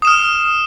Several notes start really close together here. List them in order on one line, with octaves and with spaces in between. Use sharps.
D#6 E7 F6